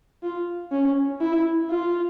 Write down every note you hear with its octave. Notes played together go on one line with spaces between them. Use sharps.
F4
C#4
E4
F4